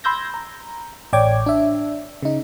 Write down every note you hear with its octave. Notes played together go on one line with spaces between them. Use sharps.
B5 C6 E6 G6 G#6 A#6
A#5
A1 C#5 D5 G5 D6 G#6
D4 E5
C#3 D#4